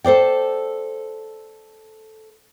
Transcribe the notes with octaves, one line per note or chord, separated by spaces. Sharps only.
A4 C5 D5 G5